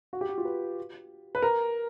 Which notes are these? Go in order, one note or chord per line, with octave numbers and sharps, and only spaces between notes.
F#4
G4
F#4
F4
B4
B4
A#4